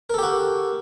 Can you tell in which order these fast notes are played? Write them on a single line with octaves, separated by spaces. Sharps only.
A#4 A4 G4 F#4